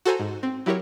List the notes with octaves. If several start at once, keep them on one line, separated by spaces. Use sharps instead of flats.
F#4 A4 C5 G#5 A#5
G#2
C4
F#3 E4 G4 A#4 C#5